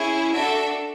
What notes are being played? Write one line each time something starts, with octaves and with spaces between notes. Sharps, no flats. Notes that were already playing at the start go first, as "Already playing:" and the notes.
Already playing: C#4 E4 G#4
D4 F#4 A4 E5